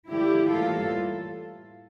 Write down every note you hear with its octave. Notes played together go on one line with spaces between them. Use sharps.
D3 F3 A3 E4 G4
A2 E3 G3 A#3 F4 A4